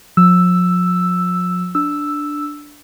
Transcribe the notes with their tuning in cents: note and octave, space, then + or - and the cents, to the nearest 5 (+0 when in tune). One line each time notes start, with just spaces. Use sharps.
F3 +45 E6 +0
D4 +0 E6 +0